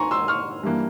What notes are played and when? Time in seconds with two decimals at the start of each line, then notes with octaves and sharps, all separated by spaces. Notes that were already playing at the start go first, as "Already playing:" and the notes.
Already playing: G#5 A#5 C6 C#6
0.11 C6 E6
0.28 C#6 F6
0.63 G2 E3 A#3